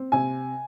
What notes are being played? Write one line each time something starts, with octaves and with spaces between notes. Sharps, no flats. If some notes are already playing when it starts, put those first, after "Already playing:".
Already playing: C4
C3 G#5